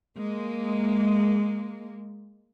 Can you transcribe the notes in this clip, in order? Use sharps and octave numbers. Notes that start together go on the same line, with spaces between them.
G#3 A#3